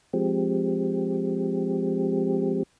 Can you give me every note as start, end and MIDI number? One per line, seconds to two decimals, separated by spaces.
0.13 2.63 53
0.13 2.63 56
0.13 2.63 60
0.13 2.63 67